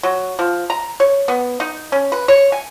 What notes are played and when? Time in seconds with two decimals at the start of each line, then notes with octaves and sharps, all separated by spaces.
0.03 F#3
0.39 F3
0.70 A#5
1.00 C#5
1.28 B3
1.60 D#4
1.92 C#4
2.12 B4
2.28 C#5
2.52 G#5